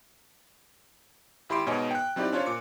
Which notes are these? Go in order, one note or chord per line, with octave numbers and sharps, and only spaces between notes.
G#1 E4 G4 B5 C6 D7
G#2 B2 C#5 D#5 G#5
G5 F#6
F#3 C4 D#4 E4 G4 D5
C#4 D4 F4 C5 C#5
A#2 D6 C#7